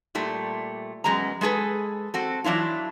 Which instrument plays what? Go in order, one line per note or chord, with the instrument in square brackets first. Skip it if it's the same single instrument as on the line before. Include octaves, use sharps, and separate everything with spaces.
[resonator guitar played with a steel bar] A#2 G3 A3
F#2 G#3 B3 A#5
G#3 A3 G#4 A4 B4
C4 F#4 A4
E3 F#3 D4 E4 F4